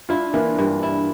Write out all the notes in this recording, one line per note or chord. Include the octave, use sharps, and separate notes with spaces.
D4 E4 F4
E3 A#3 D4
G2 A#3
E4